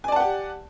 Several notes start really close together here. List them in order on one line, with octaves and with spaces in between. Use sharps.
G#5 D5 A5 F#5 G4